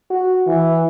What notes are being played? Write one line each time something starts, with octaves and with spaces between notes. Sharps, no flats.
F#4
E3